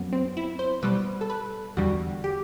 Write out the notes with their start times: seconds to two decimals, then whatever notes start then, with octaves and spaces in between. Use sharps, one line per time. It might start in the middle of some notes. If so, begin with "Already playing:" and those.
Already playing: F#2 F#3 B3
0.12 C4
0.37 E4
0.59 C5
0.82 B2 G3 B4
1.21 A4
1.30 B4
1.77 E2 D3 G3 F#4
2.24 G4